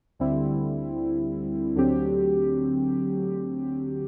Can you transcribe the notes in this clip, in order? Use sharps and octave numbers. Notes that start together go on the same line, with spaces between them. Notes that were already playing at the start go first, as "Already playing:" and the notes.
D2 D3 G3 C4 E4
D2 D3 F#3 C4 G4